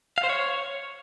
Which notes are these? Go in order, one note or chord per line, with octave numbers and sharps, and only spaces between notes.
F5
C5
C#5